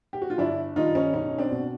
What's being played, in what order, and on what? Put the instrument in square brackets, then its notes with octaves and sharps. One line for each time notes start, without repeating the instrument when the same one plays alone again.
[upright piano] G4
F#4
F4
G1 D4 E4
G2 D#3 D#4 F4
C#4 D#4
B1 C#4 D#4
C4 D4
B2